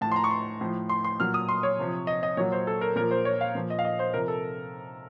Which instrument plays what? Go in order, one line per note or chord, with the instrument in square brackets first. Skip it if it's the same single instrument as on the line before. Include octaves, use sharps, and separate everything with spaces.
[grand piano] A2 F3 A5
C6
A#5
C#6
C6
A2 F3
C6
C6
A#2 F#3 F6
D#6
C6
C#5
C3 F3
D#5
D#5
A#2 F#3 C#5
C5
A4
A#4
A#2 F3 A#4
C5
C#5
F5
A#2 F3
D#5
F5
D#5
C5
C3 F3 A#4
A4